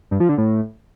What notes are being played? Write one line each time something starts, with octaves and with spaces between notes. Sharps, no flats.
G2
F3
D3
A2